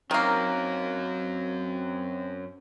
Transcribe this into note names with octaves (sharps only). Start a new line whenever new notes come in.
F#2 D#3 F#3 A#3 C4